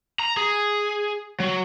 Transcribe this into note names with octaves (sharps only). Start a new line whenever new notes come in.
A#5
G#4
F#3